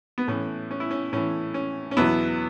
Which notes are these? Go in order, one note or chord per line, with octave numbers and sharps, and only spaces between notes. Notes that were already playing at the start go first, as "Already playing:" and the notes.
B3
A2 E3 C#4
C#4
E4
C#4
A2 E3 C#4
C#4
C#4
E2 B2 F#3 B3 E4